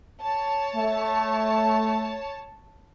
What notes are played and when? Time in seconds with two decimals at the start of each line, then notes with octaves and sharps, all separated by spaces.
0.20 C#5 A5
0.76 A3